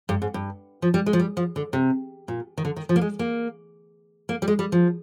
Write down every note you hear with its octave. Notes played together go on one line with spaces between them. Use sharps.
G2
G#2
G2
F3
G3
G#3
F3
G3
F3
D3
C3
A#2
D#3
D3
D#3
F3
A#3
G#3
A#3
A#3
G3
G#3
G3
F3